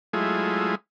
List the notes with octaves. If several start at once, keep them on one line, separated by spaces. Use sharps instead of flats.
F#3 G#3 A3 E4 F4 G#4